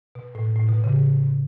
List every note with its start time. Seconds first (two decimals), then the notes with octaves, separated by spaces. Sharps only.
0.15 B2
0.35 A2
0.56 A2
0.69 B2
0.84 C#3